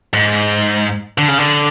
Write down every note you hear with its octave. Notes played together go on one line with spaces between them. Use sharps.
G#2
D3
C#3
D3